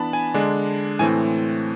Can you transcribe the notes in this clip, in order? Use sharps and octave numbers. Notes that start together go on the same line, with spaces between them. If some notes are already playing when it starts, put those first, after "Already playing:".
Already playing: E3 B3 D4 A5 B5
G#5
D3 G#3 D4
A2 E3 A3 C4 G#5